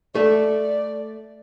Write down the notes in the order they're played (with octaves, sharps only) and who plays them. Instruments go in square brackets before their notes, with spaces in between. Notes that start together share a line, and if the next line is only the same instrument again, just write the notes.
[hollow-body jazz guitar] A3 [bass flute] D5